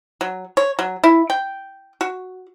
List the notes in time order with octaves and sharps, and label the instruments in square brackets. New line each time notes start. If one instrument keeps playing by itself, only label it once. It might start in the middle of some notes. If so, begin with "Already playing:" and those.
[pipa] F#3
C#5
F#3
E4
G5
F#4